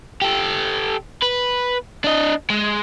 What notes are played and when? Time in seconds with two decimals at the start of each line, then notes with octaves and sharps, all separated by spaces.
0.22 G4 A4
1.23 B4
2.04 D4 D#5
2.50 G#3